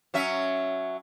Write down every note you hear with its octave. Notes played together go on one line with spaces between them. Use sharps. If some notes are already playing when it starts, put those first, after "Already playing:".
F#3 C#4 E5